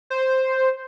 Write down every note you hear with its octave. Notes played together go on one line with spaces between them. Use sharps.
C5